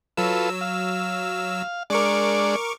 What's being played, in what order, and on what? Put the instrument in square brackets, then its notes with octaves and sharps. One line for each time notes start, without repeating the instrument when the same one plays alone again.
[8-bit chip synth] F#3 E6 [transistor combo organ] F4 A4 B4
[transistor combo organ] F5
[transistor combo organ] G#3 D4 D5 [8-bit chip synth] A#4 C#6 D6